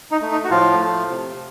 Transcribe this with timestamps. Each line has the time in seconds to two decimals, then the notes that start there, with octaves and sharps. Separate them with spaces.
0.11 D#4
0.21 A3
0.32 D#4
0.44 F#4
0.50 A2 F3 F4
0.80 A3
1.09 C3